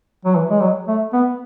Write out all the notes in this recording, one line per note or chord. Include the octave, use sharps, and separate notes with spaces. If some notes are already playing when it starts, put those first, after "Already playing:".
F#3
E3
G#3
F#3
A3
B3